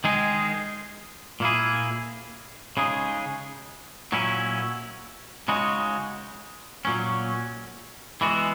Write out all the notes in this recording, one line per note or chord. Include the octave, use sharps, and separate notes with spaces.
D#3 G#3 D#4 G#4
A#2 A#3 E4 G#4
C#3 G#3 D#4 G#4
A#2 F#3 C#4 E4
C#3 G#3 D#4 F#4
A#2 F#3 C#4
E3 G#3 B3 F#4